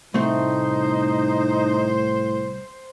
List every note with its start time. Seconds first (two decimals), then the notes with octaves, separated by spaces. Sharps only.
0.14 C2 A2 A3 C4 D#4 C5